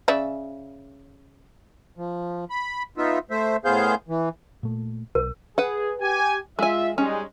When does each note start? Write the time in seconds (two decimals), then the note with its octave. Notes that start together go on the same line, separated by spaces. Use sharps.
0.08 C#3 D5 E5
1.97 F3
2.50 B5
2.97 B3 D#4 F4 E5
3.30 A3 C5 E5
3.65 A2 B3 G#4 C5 F5 G6
4.09 E3
4.63 A#2 A3
5.15 B1 A#4
5.58 G#4 B4 F#5
6.01 G4 G#5
6.59 G#3 F4 E5 G#5
6.98 G3 G#3 C#4 D#4